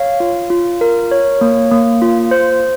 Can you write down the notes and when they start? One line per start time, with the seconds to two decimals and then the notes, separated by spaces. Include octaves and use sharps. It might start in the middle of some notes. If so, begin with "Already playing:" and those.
Already playing: C#5 F5
0.20 F4
0.50 F4
0.81 A#4
1.11 C#5
1.41 A#3
1.72 A#3
2.02 F4
2.31 C5